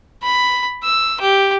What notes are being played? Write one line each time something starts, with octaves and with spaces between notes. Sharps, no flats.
B5
E6
G4